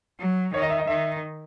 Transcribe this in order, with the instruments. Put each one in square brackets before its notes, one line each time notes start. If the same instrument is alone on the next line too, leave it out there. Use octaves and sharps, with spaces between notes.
[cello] F#3
[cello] D#3 [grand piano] C#5
[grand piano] D#5
E5
D#5
[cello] D#3 [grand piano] E5